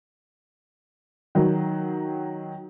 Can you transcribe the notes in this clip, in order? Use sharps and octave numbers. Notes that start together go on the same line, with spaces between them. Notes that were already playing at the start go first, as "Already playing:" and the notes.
D#3 F#3